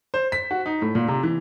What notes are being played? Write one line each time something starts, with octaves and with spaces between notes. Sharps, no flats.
C5
B6
F#4
D#4
A2
A#2
C3
E3